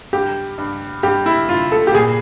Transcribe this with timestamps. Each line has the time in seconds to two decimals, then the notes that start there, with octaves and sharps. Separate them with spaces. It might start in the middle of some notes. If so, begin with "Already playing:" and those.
0.13 G2 G4
0.58 G2
1.03 G2 G4
1.26 E4
1.49 G2 F4
1.72 A4
1.87 G4
1.94 A#2 G#4